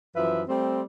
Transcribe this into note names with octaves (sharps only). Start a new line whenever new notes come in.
F#2 E3 F3 B4 E5
G3 A3 C4